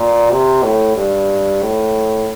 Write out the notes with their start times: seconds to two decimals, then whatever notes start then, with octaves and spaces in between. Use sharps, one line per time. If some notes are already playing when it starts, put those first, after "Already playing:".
Already playing: A#2
0.31 C3
0.63 A2
0.96 G2
1.62 A2